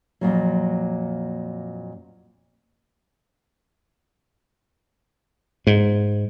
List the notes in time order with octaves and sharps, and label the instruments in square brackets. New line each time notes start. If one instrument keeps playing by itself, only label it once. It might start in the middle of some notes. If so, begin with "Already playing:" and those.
[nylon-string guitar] F2 A#2 F#3
[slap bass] G#2